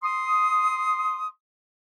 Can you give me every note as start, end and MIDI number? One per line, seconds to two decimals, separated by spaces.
0.03 1.28 84
0.03 1.28 87